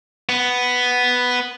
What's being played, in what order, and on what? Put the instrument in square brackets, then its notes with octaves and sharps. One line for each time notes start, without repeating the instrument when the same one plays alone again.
[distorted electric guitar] B3